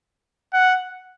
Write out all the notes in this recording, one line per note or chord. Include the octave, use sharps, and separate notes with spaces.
F#5